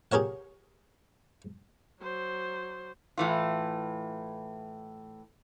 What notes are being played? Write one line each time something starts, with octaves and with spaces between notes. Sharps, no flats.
G4 G#4 A#4 C#5 F#5
F#3 C5
A2 E3 F4